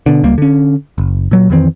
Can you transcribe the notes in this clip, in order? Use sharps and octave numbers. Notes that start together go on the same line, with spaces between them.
B2 D3
C#2 G3 A#3
D3 C#4
F#1
A#2 F#3
F2 D#3 E3 C4